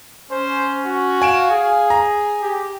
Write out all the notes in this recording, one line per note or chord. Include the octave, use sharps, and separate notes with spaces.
C#4 C5
F#4
F5 G#5 D7 E7
G#4
A#5
G4